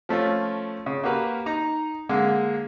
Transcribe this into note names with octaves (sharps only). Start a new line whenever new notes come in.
F3 A3 C#4 F4
C#3
A#3 F#4 G4 A#4 B4
D#4 A#5
D3 G#3 A#3